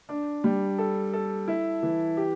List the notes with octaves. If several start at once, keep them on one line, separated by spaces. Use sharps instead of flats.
D4
G3
A4
A4
E4
E3
G4